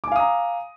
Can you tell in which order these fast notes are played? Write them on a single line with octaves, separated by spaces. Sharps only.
D6 G#5 F5 D#6 A#5